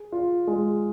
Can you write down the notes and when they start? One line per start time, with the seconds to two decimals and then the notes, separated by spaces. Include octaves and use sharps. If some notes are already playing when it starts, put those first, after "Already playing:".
Already playing: G#4
0.12 F4
0.47 G#3